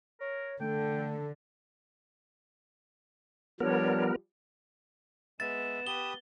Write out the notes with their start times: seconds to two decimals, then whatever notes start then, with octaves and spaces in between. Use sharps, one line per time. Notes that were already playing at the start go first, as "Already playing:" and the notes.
0.21 A#4 C#5
0.61 D3 A3 A4 G5
3.60 F3 G3 B3 D4 A#4 C#5
5.40 G#3 B3 E5 A6 E7
5.87 G4 B4 D#6 G7